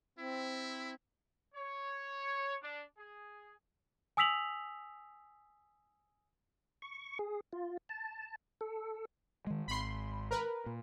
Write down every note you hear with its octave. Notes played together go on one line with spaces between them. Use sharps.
C4 E4
C#5
D4
G#4
G#5 D#6 E6 B6 F7 F#7
C#6
G#4
F4
A5
A4
D#3 G#3
G#1 B5 C6
A#4 B4
A#2